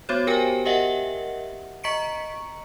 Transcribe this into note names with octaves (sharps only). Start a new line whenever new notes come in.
B3 F#4 C5 C#5
G4 A#4 C5 G5 G#5
G4 A#4 D#5 E5 F#5
D#5 A#5 C#6 B6 C#7 D7